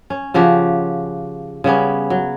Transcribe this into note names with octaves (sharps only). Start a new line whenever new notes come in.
C#4
C#3 F3 F#4 G4
C#3 G3 B3 C#4
F#3